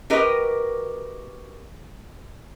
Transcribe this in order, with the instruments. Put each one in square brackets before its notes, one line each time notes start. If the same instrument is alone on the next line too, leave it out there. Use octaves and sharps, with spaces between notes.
[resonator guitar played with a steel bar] F#4 G4 A#4 B4 D#5